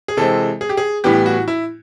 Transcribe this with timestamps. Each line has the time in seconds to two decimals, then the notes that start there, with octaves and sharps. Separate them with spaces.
0.08 G#4
0.17 C3 E3 G#3 C4 A4
0.61 G#4
0.69 G4
0.77 G#4
1.04 A2 E3 G3 B3 G4
1.26 F#4
1.48 E4